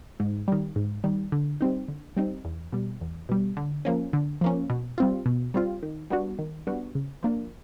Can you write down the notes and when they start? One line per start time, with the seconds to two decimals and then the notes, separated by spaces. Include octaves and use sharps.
0.20 G#2
0.48 D#3 G3
0.76 G#2
1.04 D#3 G3
1.32 D3
1.61 G3 C4 D#4
1.88 D3
2.17 G3 C4 D#4
2.45 E2
2.72 B2 G3
3.01 E2
3.29 B2 G3
3.57 D3
3.85 F3 A#3 C#4
4.13 D3
4.41 F3 A#3 C#4
4.70 B2
4.98 G3 C4 F4
5.26 B2
5.54 G3 C4 F4
5.83 D#3
6.10 G3 B3 D4 F#4
6.39 D#3
6.67 G3 B3 D4 F#4
6.95 C#3
7.23 F3 A#3 D4